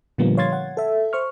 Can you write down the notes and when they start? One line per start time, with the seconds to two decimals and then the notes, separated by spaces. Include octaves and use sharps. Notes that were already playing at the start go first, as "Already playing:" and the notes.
0.18 A#2 D3 F3 G3 A#3 B3
0.37 C#5 F5 C6 G#6 A6
0.53 F#5
0.77 A4 E5
1.13 C5 C#6 F6